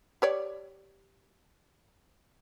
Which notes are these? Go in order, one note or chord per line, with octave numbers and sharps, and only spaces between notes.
G4 C#5 D5